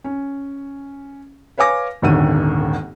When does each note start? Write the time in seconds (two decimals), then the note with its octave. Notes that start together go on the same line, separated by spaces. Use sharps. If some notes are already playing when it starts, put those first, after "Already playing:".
0.04 C#4
1.57 B4 C#5 F5 G#5 D6 A#6
2.02 D#1 G#1 D#2 D3 D#3 D#7